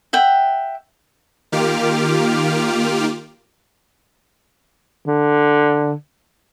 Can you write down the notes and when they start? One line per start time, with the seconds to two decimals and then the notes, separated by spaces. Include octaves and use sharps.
0.13 E5 F#5 G5
1.52 D#3 A#3 F4 G4 D6 F6
5.06 D3